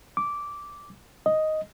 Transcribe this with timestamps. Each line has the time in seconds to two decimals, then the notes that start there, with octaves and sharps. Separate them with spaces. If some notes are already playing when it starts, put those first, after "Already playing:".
0.17 D6
1.26 D#5